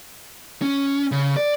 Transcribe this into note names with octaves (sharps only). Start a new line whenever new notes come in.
C#4
C#3
D5